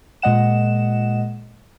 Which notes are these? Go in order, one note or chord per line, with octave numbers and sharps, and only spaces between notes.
A#2 G#3 D#5 F#5 E7